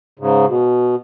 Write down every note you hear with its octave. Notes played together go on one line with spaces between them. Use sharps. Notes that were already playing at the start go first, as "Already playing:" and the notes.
G#2 C#3
B2